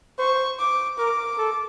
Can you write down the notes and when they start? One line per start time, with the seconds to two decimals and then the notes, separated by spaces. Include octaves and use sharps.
0.19 C5 C#6
0.59 D6
0.98 A#4 D6
1.38 A4